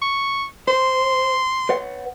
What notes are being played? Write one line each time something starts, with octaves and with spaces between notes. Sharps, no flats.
C#6
C5 C6
B4 C#5 F#5